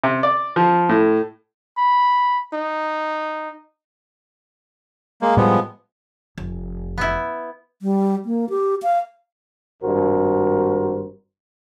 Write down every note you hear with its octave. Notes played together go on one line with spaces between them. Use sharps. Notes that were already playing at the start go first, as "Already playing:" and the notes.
C3
D5
F3
A2
B5
D#4
G#3 A#3
A2 F3 G3 G#3 B3
F1
B3 E4
G3
A#3
G4
F5
G#1 G2 F#4 A#4 C5